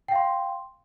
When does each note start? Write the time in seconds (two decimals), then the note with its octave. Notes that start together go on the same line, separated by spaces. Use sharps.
0.08 G5
0.12 F5
0.15 C6